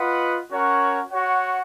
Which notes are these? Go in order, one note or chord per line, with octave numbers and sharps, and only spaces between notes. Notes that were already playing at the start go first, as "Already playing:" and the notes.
Already playing: F4 B4 D#5 F#5
C#4 F#4 A#4 C#5 F#5
F#4 C#5 F#5